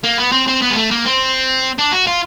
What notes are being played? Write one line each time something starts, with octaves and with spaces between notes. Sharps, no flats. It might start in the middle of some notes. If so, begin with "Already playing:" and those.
A#3
B3
C4
C4
B3
G#3
A3
A#3
C4
D4
F#4
F4